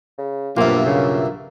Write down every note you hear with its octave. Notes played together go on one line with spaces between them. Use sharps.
C#3
B1 G2 C3 A#3 F4 E5
C#3 A#3